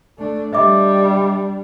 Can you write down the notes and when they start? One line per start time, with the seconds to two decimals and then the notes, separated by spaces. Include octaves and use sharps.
0.18 A3 D4
0.53 G3 D4 D#5 E5 D6